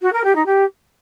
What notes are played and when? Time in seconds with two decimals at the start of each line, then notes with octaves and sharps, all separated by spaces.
0.01 F#4
0.12 A#4
0.23 G4
0.34 D#4
0.45 G4